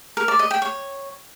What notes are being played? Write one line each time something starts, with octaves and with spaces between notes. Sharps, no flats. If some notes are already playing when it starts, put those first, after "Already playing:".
A#4
D5
D#5
G5
C#5